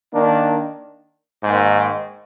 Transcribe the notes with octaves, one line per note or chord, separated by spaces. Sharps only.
D#3 A#3 D4
G#2 D#3 A#3